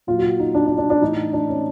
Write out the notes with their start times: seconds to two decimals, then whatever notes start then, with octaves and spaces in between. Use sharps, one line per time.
0.07 A#2 F#3 F4
0.18 F#4
0.24 F4
0.39 D#4
0.55 D4
0.67 D4
0.78 D4
0.90 D4
1.02 A2 E3 D#4
1.33 D4
1.49 C#4